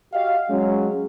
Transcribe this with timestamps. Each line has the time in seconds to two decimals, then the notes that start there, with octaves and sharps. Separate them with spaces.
0.13 F#4 G4 D#5 F5
0.50 F#3 G#3 C#4